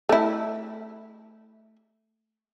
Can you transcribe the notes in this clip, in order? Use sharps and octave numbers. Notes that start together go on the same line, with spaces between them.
A3 E4